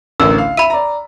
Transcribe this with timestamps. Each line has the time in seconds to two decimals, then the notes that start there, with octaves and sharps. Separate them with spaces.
0.20 A1 D2 A#4 E6
0.38 F5
0.57 E5 B5 D#7
0.70 D5 A#5